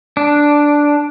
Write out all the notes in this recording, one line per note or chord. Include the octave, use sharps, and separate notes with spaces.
D4